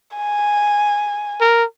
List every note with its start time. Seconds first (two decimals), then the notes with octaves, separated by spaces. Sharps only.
0.17 G#5
1.41 A#4